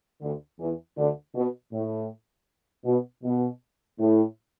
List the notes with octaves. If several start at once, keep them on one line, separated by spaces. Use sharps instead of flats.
D2 D3
E2 E3
D2 D3
B2
A2
B2
B2
A2